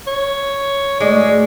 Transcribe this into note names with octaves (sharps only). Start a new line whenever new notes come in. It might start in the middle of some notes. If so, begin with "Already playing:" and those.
C#5
D2 A2 G#3 D5